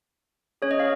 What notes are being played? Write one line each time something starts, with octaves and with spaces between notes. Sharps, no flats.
C#4 G#4 C#5
D#5
F5